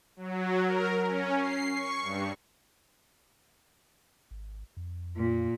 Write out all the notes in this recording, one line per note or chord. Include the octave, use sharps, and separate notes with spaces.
F#3
A#4
C#4
C7
C#6
G2
G#1
F2
A#2